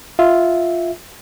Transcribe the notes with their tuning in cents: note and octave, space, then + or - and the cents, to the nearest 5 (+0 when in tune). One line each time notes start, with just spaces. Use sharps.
F4 +0 E5 -5